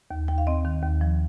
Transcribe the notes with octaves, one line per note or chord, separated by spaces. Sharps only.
D#2
D#2 G5
F5
C4 D#5
D#3
D#2
F3